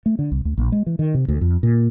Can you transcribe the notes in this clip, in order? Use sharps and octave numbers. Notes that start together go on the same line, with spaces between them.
A3
D3
C2
D2
A#1
G#3
E3
D#3
C3
D2
F2
A#2